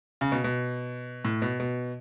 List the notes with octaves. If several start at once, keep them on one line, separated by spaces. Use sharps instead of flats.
C#3
B2
B2
A2
B2
B2